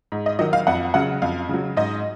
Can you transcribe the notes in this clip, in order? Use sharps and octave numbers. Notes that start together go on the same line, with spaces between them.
G#2
D#5
D#3 F#3 D#5
F5
F2 F#5
C#3 F#3 F#5
F2 F5
C#3 F#3
G#2 D#5